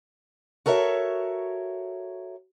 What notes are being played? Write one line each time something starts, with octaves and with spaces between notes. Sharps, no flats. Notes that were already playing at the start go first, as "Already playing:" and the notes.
F#4 A4 A#4 C#5 E5